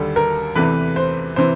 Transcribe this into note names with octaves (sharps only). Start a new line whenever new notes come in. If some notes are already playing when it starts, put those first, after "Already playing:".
Already playing: D#2 D3 G3 A4
A#4
E2 C3 E3 A3 B4
C5
C3 E3 C5